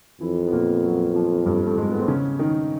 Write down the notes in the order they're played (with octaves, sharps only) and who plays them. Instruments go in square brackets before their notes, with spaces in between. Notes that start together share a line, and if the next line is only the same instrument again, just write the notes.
[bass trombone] F2 [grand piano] E3 E4
[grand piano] B3
A#2 A#3
F#3
F3
G2 G3
A3
G#2 G#3
B3
C4
C#3 C#4
D#3 D#4